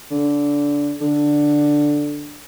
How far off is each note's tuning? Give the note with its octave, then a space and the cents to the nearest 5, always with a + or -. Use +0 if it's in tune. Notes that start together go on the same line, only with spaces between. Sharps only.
D3 -20
D3 +5